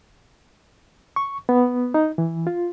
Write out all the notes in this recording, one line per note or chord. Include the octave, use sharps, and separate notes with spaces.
C#6
B3
D#4
E3
F4